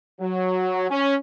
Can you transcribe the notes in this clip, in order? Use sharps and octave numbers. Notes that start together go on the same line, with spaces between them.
F#3
C#4